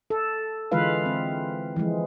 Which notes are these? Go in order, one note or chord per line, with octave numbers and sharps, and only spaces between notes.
A4
D3 E3 G#3 F4 B4 F5
C4
E3 F3 G#3